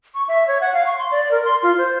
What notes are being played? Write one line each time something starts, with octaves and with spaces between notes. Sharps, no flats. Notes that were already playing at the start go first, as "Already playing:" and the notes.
C#6
E5
C#5
F#5
F5
C#6
C6
D5
A#4
C6
F4
C5